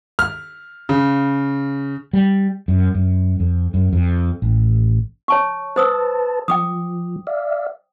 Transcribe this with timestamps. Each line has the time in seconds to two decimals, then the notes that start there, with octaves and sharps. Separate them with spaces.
0.19 F6
0.89 C#3
2.13 G3
2.68 F#2
2.95 F#2
3.40 F2
3.74 F#2
3.93 F2
4.42 A1
5.28 C#5 A5 C#6
5.76 B4 C5 A5 D#6 E6
6.48 F3 G5 D6 D#6
7.27 D5 E5 F5